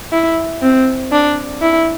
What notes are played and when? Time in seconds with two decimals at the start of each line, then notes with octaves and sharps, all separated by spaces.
0.12 E4
0.62 C4
1.12 D4
1.61 E4